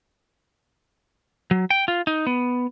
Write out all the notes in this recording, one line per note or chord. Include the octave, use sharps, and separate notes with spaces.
F#3
G5
F4
D#4
B3